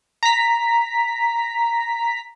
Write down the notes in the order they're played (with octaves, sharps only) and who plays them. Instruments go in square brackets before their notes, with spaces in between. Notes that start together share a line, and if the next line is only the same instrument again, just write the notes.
[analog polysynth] A#5 B6